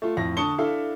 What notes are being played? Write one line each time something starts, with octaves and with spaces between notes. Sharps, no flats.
A3 F4
F2 A2 A#6
D3 A5 C#6 D#6 C#7 G7
D4 E4 A4 E5 F5